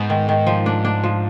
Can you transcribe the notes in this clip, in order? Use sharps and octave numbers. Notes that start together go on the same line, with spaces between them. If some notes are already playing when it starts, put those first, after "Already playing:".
Already playing: G#2 B3 D#4
D#3
D#3
F3
D4
D4
F3